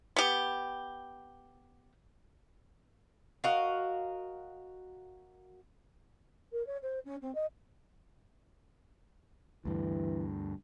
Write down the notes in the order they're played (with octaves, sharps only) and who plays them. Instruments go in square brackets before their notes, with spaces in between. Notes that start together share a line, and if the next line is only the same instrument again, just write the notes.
[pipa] B3 G4
[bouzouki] F#4 A#4 D#5 F5
[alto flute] A#4
C#5
C5
C#4
C4
D#5
[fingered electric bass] D2 G2 [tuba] E3